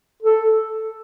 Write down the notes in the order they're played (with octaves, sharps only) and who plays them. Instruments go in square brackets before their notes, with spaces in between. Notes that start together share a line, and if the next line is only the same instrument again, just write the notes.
[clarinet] A4